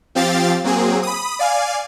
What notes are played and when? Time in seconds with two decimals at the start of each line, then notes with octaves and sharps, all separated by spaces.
0.15 F3 C4 G4 F5 A6
0.64 F#3 A#3 C4 G#4
1.03 B5 D#6
1.39 D5 F5 G#5